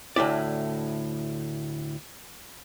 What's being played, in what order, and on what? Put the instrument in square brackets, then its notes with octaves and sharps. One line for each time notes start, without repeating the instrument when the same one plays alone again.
[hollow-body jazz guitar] D2 A2 E4 D5